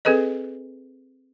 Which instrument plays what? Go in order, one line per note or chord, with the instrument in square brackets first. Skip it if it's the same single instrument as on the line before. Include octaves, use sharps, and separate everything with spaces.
[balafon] C4 G#4 A4 B4 D#5